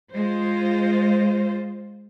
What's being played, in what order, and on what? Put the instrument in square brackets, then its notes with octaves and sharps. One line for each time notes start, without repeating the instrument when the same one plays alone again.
[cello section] G#3 F4 C5